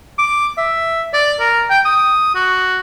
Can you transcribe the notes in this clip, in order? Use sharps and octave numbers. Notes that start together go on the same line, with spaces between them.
D6
E5
D5
A#4
G5
D#6
F#4